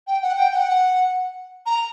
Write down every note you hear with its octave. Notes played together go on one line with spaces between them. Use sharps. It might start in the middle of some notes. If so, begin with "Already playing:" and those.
G5
F#5
G5
G5
F#5
A#5